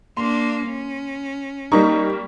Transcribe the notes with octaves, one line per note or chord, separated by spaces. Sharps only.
A#3 D4 C6
C#4
G3 A#3 D#4 C#6